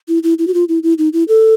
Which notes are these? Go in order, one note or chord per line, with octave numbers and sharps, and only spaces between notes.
E4
E4
E4
F#4
F4
E4
E4
D#4
E4
A4